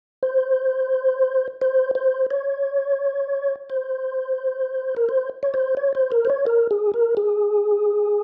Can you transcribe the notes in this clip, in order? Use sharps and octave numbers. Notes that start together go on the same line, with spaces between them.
C5
C5
C5
C#5
C5
A#4
C5
C#5
C5
C#5
C5
A#4
C5
C#5
A#4
G#4
A#4
G#4